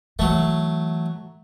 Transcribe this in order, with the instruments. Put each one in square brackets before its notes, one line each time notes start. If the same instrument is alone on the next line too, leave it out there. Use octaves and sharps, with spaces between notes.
[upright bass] E3 [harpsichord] F#3 A3